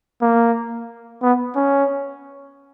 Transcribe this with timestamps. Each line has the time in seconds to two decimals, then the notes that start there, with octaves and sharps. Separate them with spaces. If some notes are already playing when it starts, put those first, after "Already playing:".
0.22 A#3
1.22 B3
1.56 C#4